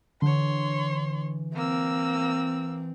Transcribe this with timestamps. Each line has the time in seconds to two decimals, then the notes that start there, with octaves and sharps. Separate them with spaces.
0.22 D3 E3 C#5 C6
1.55 A#3 C4 E6